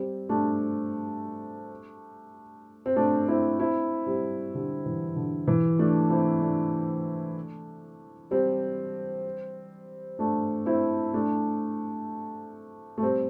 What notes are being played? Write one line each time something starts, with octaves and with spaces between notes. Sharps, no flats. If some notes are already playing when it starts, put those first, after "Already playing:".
Already playing: G3 C4
A3 D4
C4
A3 D4
C4 E4
C4 E4
G3 C4
D3 G3
E3
D3
E3
A3 D4
C4 E4
A3 D4
G3 C4
A3 D4
C4 E4
A3 D4
A3
G3 C4